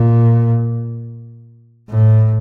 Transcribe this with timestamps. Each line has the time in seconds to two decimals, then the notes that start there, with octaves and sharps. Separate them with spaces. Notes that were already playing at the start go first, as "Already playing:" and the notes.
Already playing: A#2
1.90 A2